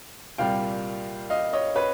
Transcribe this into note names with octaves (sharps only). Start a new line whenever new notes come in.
C2 A#2 G3 F5 G5
D#5 F5
C#5 D#5
B4 C#5